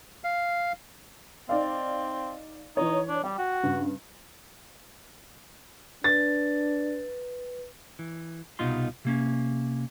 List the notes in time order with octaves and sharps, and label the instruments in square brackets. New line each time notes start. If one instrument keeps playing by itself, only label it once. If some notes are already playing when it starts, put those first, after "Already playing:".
[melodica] F5
[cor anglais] C4 [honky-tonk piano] D#4 D5 F5
[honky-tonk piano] E3 C#5 [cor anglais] D#4
[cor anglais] D4
[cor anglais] G3 [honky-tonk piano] G5
[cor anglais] F#4
[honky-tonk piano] G2 C#3
[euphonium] D4 [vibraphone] B4 [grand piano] A6
[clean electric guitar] E3
C2 B2 D#4 F4 C6
C3 A#3 C#4